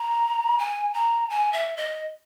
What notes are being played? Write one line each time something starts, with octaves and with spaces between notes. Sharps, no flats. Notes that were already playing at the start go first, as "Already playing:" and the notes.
Already playing: A#5
G#5
A#5
G#5
E5
D#5